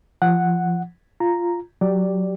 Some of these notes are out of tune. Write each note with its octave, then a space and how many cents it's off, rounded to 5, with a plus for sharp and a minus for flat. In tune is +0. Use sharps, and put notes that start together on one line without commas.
F3 -20 F#5 +0
F4 -5 A#5 +0
F#3 +0 G4 +0 D5 +0